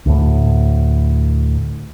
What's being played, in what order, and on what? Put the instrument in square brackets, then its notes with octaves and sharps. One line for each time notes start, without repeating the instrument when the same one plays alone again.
[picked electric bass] D2 A2